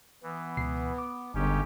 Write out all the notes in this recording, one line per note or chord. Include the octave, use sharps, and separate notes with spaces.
E3 B3
C#2 B2 C7
D6
G1 C#3 G#3 C#4 D#4 G4